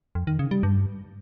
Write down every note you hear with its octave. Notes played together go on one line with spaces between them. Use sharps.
F2
D#3
C#3
G3
G2